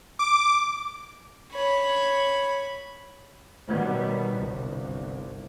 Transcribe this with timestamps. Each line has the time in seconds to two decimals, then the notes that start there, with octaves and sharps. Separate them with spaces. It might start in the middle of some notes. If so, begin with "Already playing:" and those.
0.19 D6
1.52 C#5 B5
3.68 B2 D#3 F#3 G3 B3
4.35 G1 C2